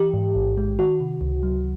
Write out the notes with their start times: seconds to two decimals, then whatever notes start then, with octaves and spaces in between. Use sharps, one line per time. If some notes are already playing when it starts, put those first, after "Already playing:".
Already playing: E3 G4
0.14 G#2
0.35 A1
0.57 G#3
0.79 D#3 F#4
1.00 C3
1.21 C#2
1.43 F#3